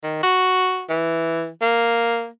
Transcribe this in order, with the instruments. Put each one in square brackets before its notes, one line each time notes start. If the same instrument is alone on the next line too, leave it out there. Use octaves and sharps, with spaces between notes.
[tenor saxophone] D#3
F#4
E3
A#3